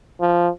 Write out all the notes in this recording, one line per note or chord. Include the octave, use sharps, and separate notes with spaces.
F3